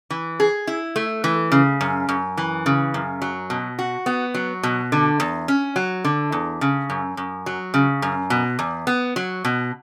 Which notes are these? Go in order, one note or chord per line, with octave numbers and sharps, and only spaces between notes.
E3
G#4
E4
A3
E3
C#3
F#2
F#2
E3
C#3
F#2
F#3
B2
F#4
B3
F#3
B2
D3
E2
C#4
F#3
D3
E2
C#3
F#2
F#2
F#3
C#3
F#2
B2
E2
B3
F#3
B2